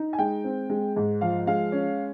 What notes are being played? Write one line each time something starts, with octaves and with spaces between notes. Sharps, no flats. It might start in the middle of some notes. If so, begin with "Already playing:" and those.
Already playing: D#4
G#5
G#3 G5
C4
G#3
G#2
F3 F5
G#3 F5
C#4